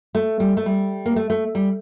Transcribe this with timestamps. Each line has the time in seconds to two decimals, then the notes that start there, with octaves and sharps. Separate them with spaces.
0.15 A3
0.40 G3
0.57 A3
0.66 G3
1.06 A#3
1.16 A3
1.30 A3
1.55 G3